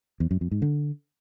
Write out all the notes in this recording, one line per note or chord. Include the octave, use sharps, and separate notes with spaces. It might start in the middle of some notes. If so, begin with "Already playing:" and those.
E2
F#2
F2
G#2
D3